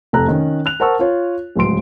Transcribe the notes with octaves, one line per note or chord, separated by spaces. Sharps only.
F1 C3 A4 A#5 F#6
D#3 C#4
F#6 F7
A#4 C5 F#5 A5 C#6 E6
F4 C#5
D1 C#2 F#3 C6 D7